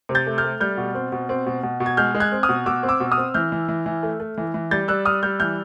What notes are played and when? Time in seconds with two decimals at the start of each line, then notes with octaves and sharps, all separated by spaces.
0.09 C3
0.15 G6 A6
0.26 A3
0.38 F6 G6
0.44 A3
0.60 G3 F6 G6
0.77 B2
0.95 C4
1.12 B2
1.29 C4
1.46 B2
1.63 B2
1.80 B2
1.86 G#6
1.97 G#3 F6 G6
2.15 G#3
2.20 F#6 G#6
2.32 C4
2.43 D#6 F6
2.49 B2
2.66 B2 D6 E6
2.83 C4
2.89 D6 E6
3.00 B2
3.11 D#6 F6
3.17 C4
3.34 E3 F6 G6
3.52 E3
3.68 E3
3.86 E3
4.03 A3
4.20 A3
4.38 E3
4.54 E3
4.71 G3 G6 A6
4.88 G3 E6 F#6
5.05 G3 D#6 F6
5.23 G3 F6 G6
5.40 E3 F6 G6